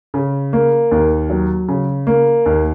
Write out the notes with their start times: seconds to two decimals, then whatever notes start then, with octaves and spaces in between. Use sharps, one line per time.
0.14 C#3
0.53 A#3
0.91 D#2
1.29 F#3
1.68 C#3
2.07 A#3
2.46 D#2